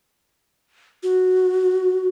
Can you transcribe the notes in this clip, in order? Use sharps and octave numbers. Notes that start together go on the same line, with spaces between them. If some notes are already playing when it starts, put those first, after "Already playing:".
F#4